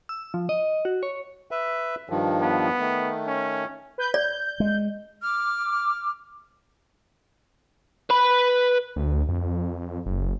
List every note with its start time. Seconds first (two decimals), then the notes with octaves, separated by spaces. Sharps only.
0.09 E6
0.34 F3
0.49 D#5
0.85 F#4
1.03 C#5
1.51 B4 E5
2.10 G2 D#3 F3
2.42 B3
2.79 D#3 A3
3.26 C#4
3.98 B4 G6
4.14 D5 G6
4.60 G#3
5.22 D6 F6
8.10 B4 B5
8.96 D2
9.29 F2
10.06 F#1